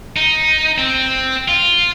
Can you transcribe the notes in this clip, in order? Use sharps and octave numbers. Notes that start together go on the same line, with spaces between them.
D#4
C4
F4